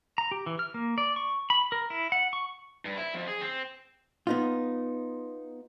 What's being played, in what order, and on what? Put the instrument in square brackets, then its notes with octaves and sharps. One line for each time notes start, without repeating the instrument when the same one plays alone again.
[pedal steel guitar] A#5
G4
E3
F6
A#3
D5
C#6
B5
A#4
E4
F#5
C#6
[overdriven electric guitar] G2
E4
F2
G#4
C4
[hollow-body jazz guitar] B3 D#4 F4